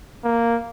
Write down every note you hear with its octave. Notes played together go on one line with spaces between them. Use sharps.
A#3